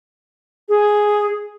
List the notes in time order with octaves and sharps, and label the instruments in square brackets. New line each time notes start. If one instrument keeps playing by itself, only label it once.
[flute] G#4